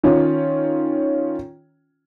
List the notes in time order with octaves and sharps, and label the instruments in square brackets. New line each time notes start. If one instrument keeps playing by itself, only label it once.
[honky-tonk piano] D#3 C#4 F4